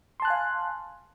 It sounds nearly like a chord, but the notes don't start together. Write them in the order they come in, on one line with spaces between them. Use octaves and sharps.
C6 A5 F#6 G#5 F5